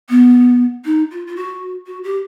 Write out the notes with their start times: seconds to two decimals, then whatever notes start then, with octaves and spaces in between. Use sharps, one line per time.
0.09 B3
0.85 D#4
1.11 F4
1.27 F4
1.36 F#4
1.87 F#4
2.04 G4